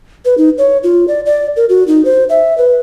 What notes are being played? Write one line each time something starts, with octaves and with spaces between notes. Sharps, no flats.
B4
D#4
C#5
F4
D5
D5
A#4
F#4
D#4
C5
E5
B4